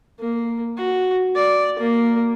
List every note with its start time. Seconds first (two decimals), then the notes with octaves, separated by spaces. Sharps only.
0.20 A#3
0.77 F#4
1.35 D5
1.79 A#3